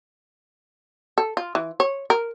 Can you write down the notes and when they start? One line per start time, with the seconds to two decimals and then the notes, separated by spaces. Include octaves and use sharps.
1.18 A4
1.37 F4
1.55 E3
1.80 C#5
2.10 A#4